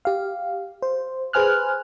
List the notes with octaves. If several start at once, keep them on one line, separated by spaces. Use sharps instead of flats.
G4 F5
C5
G#4 B4 C5 G#5 F6 F#6